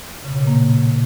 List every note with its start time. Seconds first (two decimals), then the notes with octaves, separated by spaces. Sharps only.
0.24 C#3
0.30 B2
0.36 C#3
0.41 A#2
0.47 A#3